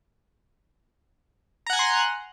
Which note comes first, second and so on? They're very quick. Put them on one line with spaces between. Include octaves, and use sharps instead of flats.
A#5 F#5 G#5 F#6 C6